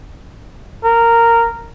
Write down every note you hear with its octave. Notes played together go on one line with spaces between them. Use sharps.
A#4